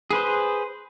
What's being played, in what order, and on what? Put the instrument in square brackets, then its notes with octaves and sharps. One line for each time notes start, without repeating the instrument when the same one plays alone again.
[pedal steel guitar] G#4 B4 C5